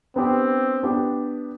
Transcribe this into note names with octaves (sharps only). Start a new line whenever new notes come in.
B3 C4 D4 G4
B3 D4 G4